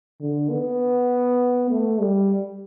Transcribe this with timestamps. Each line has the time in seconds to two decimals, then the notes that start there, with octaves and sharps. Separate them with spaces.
0.21 D3
0.50 B3
1.70 A3
2.01 G3